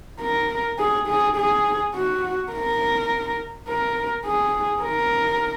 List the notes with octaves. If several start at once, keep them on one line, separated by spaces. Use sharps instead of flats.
A#4
G#4
G#4
G#4
F#4
A#4
A#4
G#4
A#4